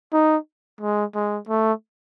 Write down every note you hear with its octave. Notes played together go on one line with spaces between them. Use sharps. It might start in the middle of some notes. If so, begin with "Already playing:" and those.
D#4
G#3
G#3
A3